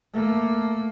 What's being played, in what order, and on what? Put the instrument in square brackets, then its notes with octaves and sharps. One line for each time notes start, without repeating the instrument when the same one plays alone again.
[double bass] A3 A#3